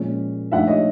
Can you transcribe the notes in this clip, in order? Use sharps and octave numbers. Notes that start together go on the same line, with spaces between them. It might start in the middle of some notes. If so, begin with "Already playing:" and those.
Already playing: A#2 F3 G#3 C#4
G#2 F3 A3 D4 E5 F#5
C#5 D#5